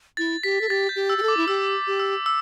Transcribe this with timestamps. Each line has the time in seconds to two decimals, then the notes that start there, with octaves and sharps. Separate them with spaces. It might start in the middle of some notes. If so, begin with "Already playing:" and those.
0.17 E4 A6
0.43 G4 B6
0.61 A4
0.69 G4 A6
0.89 G6
0.96 G4
1.10 E6
1.18 G4
1.23 A4
1.28 D6
1.37 E4
1.48 G4 E6
1.87 G4
2.00 E6
2.26 E6